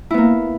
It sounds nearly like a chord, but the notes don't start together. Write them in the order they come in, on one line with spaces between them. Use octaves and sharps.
E4 B3 A#3